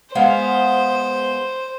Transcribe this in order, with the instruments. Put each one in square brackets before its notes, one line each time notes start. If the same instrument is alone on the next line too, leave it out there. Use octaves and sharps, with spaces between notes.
[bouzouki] G#3 B3 F5 [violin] C5